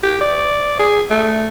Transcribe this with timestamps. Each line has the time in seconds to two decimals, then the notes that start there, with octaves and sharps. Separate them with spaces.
0.03 G4
0.21 D5
0.79 G#4
1.10 A3